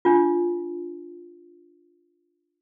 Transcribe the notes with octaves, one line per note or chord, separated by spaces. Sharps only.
D4 F4